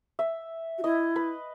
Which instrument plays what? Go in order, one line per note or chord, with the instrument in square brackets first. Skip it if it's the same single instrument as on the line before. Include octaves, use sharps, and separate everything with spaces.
[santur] E5
[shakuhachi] F#4
[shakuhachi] E4 [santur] D#5
[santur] B4